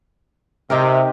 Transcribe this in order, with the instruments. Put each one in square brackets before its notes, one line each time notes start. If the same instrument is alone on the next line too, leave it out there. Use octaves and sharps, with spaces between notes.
[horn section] C3 [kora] D#4 G4 A#4